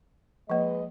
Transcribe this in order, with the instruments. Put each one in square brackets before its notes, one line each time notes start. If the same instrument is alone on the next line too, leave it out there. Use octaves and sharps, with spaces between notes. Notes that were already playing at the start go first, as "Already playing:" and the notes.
[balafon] F3 A#3 [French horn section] G#3 B4 D#5